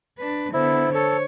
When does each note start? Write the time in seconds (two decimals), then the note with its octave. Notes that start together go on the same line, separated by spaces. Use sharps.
0.18 D4 B4
0.54 D3 B3 E4 C5
0.95 A4 C#5